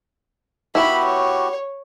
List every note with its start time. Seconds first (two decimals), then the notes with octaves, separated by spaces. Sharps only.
0.75 B3 E4 F#4 G4 B5
1.04 C#5